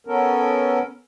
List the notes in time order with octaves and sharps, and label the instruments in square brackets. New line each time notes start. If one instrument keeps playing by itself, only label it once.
[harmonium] B3 C#4 A4 A#4